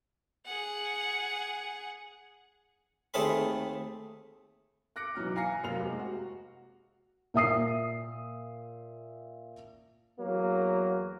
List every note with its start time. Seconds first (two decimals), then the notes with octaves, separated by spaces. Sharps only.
0.46 G#4 F#5
3.14 D#2 A3 C4 G#4 A4 B5
4.96 D6 F#6 A#6 C#7 D7
5.15 B1 E3 F#3 F6
5.35 F5 G#5 A#5 A#6 C7 C#7
5.63 F1 F#2 A#3 F5 F7
5.80 C3 G#3
5.99 F#4
7.34 A#2 E5 D#6 C7
10.20 E2 F#3 A#3